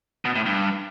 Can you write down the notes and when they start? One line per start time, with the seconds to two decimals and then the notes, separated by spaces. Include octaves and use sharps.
0.25 B2
0.35 A2
0.46 G2